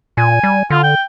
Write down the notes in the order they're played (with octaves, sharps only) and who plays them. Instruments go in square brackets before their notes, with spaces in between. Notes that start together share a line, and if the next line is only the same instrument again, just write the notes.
[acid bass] A#2 [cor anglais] G#5
[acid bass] G3
[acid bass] D3 [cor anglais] F4
[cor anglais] G5